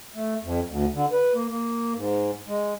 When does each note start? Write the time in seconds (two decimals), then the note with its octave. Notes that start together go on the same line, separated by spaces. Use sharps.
0.15 A3
0.44 F2
0.69 D2
0.95 D3
1.12 B4
1.34 A#3
1.50 A#3
1.96 G#2
2.48 G#3